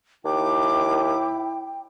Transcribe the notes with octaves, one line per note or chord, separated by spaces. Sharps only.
D#2 E4 G5 D6